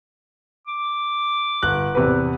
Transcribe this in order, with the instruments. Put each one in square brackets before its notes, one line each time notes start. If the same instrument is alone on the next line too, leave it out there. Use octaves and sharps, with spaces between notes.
[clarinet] D6
[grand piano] G1 F#6
E2 C3 B4